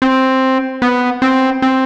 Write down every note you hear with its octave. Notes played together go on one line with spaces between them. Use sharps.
C4
B3
C4
C4